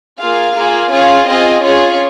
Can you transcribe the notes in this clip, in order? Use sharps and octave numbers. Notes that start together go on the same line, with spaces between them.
A#3 F4 G#4 F5
A#3 F4 G#4
C#4 F4 G#4 F5
C4 F4 G#4 D#5
C#4 F4 G#4 C#5